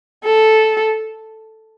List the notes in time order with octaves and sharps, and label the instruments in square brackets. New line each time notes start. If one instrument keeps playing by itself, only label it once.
[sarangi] A4